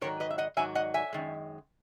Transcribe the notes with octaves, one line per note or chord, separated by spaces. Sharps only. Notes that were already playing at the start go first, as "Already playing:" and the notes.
G#2 D#3 F#3 A#4 C#5
B4 D#5
E5
D#5 F#5
G#2 D#3 F#3 E5 G#5
D#5 F#5
E5 G#5
F#2 D#3 G#3